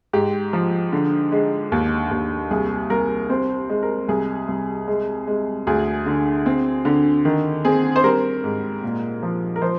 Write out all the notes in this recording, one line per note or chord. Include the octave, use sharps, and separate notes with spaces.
G#2 G4
F3
D3
G#3
D#2
D#2
C2 G#4
C2 A#4
C4 C5
G#3
A#4
C2 G#4
C2
G#3
G#3
D2 G#4
D3
C4
D3
D#3
C4 G#4
C5
G3 A#4
G#2
A#2
F3
A#4
F3 C5